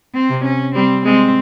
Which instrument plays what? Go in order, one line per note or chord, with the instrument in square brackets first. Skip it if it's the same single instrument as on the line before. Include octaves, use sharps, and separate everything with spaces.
[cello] C4
[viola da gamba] C3
[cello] C#4
[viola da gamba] G3 [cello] C4
[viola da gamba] G#3 [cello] C4